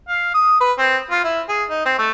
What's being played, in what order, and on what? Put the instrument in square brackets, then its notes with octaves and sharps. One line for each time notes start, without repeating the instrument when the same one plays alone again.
[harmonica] F5
D#6
B4
C4
F4
E4
G#4
D#4
C4
A3